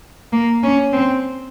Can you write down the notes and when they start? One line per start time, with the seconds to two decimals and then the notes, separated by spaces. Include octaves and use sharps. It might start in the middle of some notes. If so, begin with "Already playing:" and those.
0.33 A#3
0.63 C#4
0.93 C4